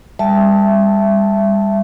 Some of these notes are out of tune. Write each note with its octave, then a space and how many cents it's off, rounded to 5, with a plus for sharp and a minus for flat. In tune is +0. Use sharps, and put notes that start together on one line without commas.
G3 +35 E5 +15 A5 +0